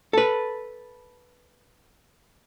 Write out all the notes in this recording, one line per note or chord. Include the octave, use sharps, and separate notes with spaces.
A4 B4